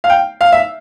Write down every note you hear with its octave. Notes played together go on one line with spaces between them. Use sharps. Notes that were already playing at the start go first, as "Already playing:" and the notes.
F5
G5
F5
E5